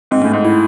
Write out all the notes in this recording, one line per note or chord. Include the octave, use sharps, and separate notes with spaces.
G#2 C4
A2 C#4
G#2
E4